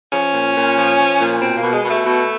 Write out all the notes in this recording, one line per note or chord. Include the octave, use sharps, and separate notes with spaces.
F3 C#4
A#2
A#2
F3
F3
A#2
B2 C4
A#3
B2
G#3
B2
A3
B2